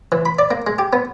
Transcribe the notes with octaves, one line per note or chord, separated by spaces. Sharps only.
E3
B5
D5
A#3
G#3
G4
B3